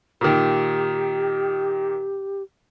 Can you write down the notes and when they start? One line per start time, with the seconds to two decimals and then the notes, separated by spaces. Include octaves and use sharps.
0.21 A#2 D#3 G4